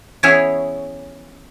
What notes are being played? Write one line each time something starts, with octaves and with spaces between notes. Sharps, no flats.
E3 B3 C#4 E4 G#4 C#5